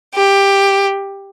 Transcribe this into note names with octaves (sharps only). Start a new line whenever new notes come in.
G4